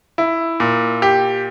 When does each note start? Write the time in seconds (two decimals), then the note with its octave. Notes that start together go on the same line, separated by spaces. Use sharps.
0.18 E4
0.60 A#2
1.02 G4